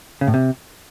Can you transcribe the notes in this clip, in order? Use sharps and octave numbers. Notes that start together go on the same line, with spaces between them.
C#3
A2
C3